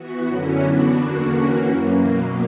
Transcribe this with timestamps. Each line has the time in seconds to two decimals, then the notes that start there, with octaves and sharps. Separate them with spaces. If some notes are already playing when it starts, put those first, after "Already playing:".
Already playing: E3 B3 F#4
0.26 F#2 D3 F#3 C#4 E4
0.61 E3 B3 D4 F#4
0.95 E2 D3 A#3 D4 F#4
1.29 E3 A#3 C#4 F#4
1.64 F#2 E3 A#3
1.99 B2 F#3 A#3